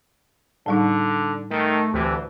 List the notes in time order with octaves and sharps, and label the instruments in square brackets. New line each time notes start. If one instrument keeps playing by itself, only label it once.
[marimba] A2 G3 D#4 [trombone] D3
[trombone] D#3 [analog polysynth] A3
[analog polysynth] D2 E3 [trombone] C3